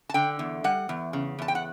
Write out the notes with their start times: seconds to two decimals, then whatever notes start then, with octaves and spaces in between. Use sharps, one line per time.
0.10 A5
0.14 D3 G5
0.39 E2
0.64 G3 F#5
0.89 E2
1.13 C#3
1.39 E2 A5
1.48 G5
1.55 F#5